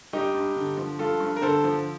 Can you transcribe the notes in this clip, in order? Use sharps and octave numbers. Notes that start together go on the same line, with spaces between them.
G2 D#4 G4
G2
D3
F3
G2 F4 A4
G2
A#4
D3 A4 C5
F3